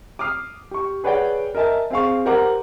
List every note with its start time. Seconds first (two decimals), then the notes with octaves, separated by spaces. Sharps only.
0.19 D6 D#6 F6 C7
0.71 G4 C#6
1.04 G#4 B4 C#5 D5 F#5 G5
1.55 A#4 D#5 E5 G#5 A5
1.90 C4 G#4 F5 C#6
2.26 G4 A#4 C5 F#5 A#5 D6